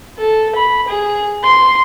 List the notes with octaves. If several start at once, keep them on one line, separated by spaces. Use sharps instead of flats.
A4
B5
G#4
C6